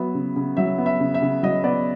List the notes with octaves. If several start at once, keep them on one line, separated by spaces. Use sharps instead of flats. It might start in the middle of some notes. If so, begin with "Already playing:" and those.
Already playing: F#3 B3 E5
C#3
C#3
F#3 E5
B3
E5
C#3
E5
C#3
F#3 D#5
B3 D5